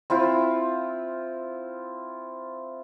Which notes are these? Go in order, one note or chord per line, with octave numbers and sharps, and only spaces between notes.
C4 E4 F4